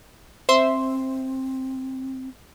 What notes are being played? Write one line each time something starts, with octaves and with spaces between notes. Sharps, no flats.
C4 C5 E5 C6